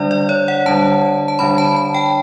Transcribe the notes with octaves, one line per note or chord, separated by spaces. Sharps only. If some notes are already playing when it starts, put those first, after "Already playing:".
Already playing: D3 G3 D4 D5
D5
C#5
F#5
D3 G3 D4 A5
A5
D3 G3 D4 B5
A5
A5
G5